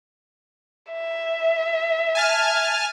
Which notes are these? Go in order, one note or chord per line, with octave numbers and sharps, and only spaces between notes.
E5
G#5 A5 F6